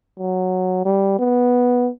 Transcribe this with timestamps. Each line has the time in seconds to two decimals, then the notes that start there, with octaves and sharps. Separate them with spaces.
0.19 F#3
0.85 G3
1.19 B3